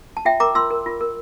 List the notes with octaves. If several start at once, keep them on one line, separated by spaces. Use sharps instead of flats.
A5
F4 E5 G5
A#4 A#5 D6
F4 C6 E6
A#4
F4
A#4